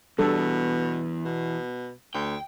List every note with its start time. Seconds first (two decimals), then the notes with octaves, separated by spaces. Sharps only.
0.19 E2 B2 G3 D4 A4
1.25 B2
2.14 D2 G5